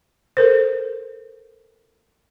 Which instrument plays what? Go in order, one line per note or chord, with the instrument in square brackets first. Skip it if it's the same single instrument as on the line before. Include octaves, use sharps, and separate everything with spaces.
[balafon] A4 A#4 C5